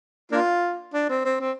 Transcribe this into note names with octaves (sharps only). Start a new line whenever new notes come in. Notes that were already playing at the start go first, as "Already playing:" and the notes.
A#3 D4 F4
D4
C4
C4
C4